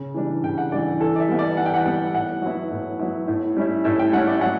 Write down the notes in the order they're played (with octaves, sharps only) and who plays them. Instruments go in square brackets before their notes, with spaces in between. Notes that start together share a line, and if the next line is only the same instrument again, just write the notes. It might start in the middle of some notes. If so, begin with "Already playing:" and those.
Already playing: [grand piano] C#3
E3 G3 D4
C#3 G5
F#5
E3 G3 D4 D5
E3 A4
D5
E5
G3 B3
D5
E3 F#5
G5
F#5
G3 B3 G5
A2 F#5
F#3 B3 E4
A2
F#3 B3 E4
A2
G3 C#4 E4
A2 E5
G5
G3 C#4 E4 F#5
D5
F#3 F#5